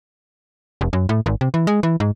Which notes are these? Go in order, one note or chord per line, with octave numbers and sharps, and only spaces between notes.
F1
F#2
A2
G#1
C3
E3
G#3
E3
G#2